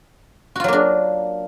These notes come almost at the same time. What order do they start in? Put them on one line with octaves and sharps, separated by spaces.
F#4 F4 F#3 A#3 D4